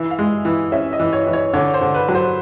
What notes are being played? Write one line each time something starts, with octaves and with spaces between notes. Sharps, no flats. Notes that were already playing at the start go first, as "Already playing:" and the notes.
Already playing: E3 E5
F5
G#3
E3
C#4 E5
D#5
E3
C#5
E3
C#5
D3 C#5
C5
D3
B4
F#3
C5